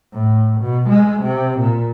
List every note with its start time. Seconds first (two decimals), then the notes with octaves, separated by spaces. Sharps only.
0.14 A2
0.61 B2
0.89 G#3
1.23 C3
1.60 A#2